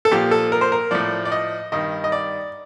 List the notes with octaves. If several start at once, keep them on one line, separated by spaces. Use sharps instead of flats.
A4
A#2 F3 G4
A4
A#4
C5
A#4
A2 F3 D5
D5
D#5
G2 D#3 D#5
D#5
D5